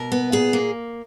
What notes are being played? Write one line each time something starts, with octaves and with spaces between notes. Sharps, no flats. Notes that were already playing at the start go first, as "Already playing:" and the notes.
Already playing: B2 A#4
B3
A#2 G#4
A#3